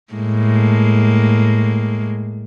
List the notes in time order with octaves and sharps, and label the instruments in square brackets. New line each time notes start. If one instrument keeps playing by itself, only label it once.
[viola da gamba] A2 G#3 A#3